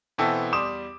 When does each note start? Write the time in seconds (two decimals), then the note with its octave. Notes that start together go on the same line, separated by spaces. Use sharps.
0.18 B2 E3 B3 C4 E4 A4
0.52 E2 G3 C6 D6 D#6 E7